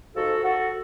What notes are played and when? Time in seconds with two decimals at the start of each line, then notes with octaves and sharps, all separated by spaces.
0.15 G#2 F3 F#4 A4
0.43 F#4 A4